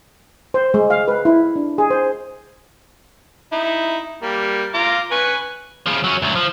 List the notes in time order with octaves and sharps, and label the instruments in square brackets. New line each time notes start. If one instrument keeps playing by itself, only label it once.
[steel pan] C5
G#3
F5
B4
E4
D4
G#4
C5
[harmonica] D#4 E4
G3 A#3
F4 A#5 D6
B4 G#5 C#6
[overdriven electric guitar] C#3 F3
F#3 C#4
D2 F#3
F3